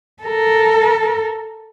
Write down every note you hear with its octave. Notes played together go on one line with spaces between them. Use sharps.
A4 A#4